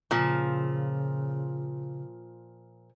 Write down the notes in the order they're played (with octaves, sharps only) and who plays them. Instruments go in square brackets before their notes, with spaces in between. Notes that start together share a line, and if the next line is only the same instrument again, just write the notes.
[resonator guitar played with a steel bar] A#2 F3 [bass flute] C#3